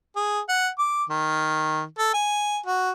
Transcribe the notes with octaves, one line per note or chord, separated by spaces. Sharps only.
G#4
F#5
D6
D#3
A4
G#5
F#4